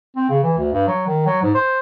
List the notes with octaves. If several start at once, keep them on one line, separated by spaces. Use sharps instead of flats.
C4
C#3
E3
D2
G2
F#3
D#3
F#3
G#2
C5